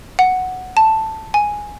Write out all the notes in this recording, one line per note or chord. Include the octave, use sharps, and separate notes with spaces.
F#5
A5
G#5